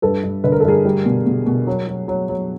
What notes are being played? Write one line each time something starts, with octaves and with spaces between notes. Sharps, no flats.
G2 A4 B4
G2
D3 B4
A#4
A4
G2 G#4 A#4
G3
B2
B2
B2
F#3
F#3
F#3
F#3